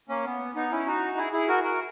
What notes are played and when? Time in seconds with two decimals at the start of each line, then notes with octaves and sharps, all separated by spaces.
0.09 A#3 C#4
0.25 B3
0.55 B3 D#4
0.71 C#4 E4
0.87 D#4 F#4
1.17 E4 G#4
1.33 E4 G#4
1.48 F#4 A#4
1.64 F#4 A#4